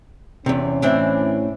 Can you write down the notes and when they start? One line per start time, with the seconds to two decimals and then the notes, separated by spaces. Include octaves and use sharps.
0.46 E2 C3 C#4
0.82 A2 E3 C4 D4 E5